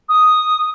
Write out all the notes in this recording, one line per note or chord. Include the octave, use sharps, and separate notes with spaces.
D#6